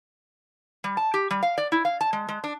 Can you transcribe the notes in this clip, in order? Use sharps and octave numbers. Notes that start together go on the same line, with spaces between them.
G3
A5
G4
G3
F5
D5
E4
F5
A5
G#3
G#3
D4